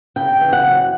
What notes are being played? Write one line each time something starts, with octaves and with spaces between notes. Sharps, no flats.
C#3 G5
E3
F#5
F#2